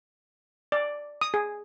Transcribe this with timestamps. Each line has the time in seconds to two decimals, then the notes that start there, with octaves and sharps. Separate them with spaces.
0.72 D5
1.21 D#6
1.34 G#4